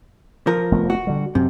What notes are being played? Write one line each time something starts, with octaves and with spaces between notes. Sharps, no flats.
F3 A#4
F1 A3 B3
F#4
D3 G3
F#2 C3